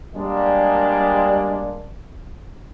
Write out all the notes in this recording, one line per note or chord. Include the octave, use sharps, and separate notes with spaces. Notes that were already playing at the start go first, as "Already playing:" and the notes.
G3 G#3 A#3 D4